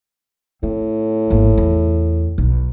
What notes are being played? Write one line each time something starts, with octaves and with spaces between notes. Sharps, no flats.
A2 C4
G#1 A#3
E2
B1